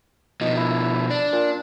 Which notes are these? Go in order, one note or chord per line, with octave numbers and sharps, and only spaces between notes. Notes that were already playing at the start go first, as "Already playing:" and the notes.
B2 F3 D#4
E4
D4
A#2